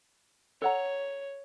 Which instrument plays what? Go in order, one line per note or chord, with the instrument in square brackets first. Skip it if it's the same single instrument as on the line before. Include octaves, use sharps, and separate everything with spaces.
[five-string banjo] A4 F#5 A#5 [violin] C#5